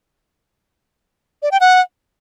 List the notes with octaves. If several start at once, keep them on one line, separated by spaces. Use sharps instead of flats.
D5
G5
F#5